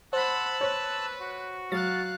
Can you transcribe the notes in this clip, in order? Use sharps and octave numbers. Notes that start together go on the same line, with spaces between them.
C5 F#5 A5 B5 E6 F#6
B4 C#5
F#4
F#3 F5 F#6 A6